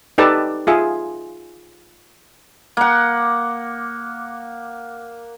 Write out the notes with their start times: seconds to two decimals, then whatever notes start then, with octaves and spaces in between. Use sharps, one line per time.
0.18 D#4 G4 A4 B4 D5 A5
0.67 F4 G#4 E5
2.77 A#3 F#5